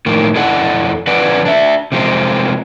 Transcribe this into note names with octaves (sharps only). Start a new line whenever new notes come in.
A2 D#3 F3 A#3
F2 E4 A4 D5 F#5
D3 F3 C4 B4 D5 F#5
D4 E5
C3 F3 G#3 C4